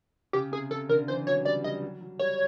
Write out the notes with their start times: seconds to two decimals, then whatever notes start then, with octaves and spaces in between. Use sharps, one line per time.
0.33 C#3 G4
0.52 C3 G#4
0.70 C#3 A4
0.89 D3 A#4
1.08 E3 C5
1.27 F#3 C#5
1.45 G3 D5
1.64 G3 D#5
1.82 F#3
2.01 F#3
2.19 G3 C#5